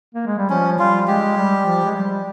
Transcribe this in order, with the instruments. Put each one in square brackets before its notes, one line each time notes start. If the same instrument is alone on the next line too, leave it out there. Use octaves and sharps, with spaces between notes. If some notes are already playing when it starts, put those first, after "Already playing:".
[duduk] A#3
G#3
G3
[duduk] F3 [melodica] C#4
[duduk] G3 [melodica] F4
[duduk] G#3 [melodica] G4
[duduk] G3
F3
G#3
G3